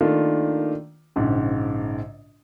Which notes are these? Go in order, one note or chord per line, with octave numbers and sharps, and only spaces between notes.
D#3 A3 A#3 D4 F4
A#1 G#2 C#3